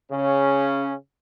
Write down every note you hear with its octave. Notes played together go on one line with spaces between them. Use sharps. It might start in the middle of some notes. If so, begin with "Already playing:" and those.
C#3 C#4